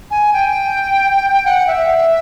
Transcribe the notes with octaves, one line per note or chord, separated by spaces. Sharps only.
G#5
G5
F#5
E5